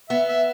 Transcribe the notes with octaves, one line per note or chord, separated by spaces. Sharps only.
B3 E5
E5